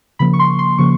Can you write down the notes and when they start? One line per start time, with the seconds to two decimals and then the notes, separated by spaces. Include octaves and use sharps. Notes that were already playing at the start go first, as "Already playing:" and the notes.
0.19 C#3 F3 A#3 B5
0.33 C#6
0.39 C6
0.59 C6
0.78 C#3 F3 A#3 C#6